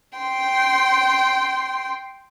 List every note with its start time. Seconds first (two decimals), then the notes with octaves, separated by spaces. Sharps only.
0.18 G5 C6